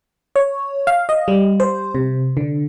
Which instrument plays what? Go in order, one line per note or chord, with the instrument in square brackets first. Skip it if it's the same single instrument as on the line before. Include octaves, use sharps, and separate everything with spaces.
[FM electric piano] C#5
F5
D#5
G3
C5
C3
D3